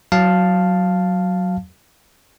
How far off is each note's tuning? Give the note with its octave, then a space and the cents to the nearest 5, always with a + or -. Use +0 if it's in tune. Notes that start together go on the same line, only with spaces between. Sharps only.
F#3 +0 F5 +0 A5 +0